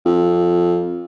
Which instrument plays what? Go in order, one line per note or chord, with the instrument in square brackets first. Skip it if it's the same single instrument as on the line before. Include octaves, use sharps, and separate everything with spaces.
[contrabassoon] F2